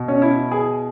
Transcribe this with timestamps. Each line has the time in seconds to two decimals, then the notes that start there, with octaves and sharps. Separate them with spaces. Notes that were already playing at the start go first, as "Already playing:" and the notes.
Already playing: B2
0.08 C#4
0.22 E4
0.52 G#4